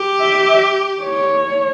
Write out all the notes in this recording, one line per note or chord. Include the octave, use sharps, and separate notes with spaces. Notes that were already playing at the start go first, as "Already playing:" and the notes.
Already playing: G4
E5
C#5